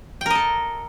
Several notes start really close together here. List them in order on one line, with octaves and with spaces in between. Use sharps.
G5 A#4 D#5 A4